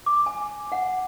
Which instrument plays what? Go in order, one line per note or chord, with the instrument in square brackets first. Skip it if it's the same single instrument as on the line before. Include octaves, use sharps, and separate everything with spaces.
[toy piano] D6
G#5
F#5